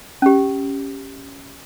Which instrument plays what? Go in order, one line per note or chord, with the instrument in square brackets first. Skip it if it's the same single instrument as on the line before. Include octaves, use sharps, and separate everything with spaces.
[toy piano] C#4 G4